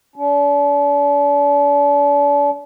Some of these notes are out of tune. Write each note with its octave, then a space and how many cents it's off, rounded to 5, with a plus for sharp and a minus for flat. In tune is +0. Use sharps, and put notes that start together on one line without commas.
D4 -40